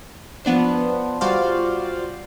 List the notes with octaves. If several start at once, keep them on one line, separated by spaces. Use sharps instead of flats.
F3 B3 D4 C5
G3 F4 F#4 C5 D5 F5